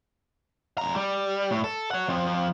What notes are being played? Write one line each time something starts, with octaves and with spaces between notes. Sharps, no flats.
F2 A#5
G3
A2
A4
C#5 F#5
F3 C4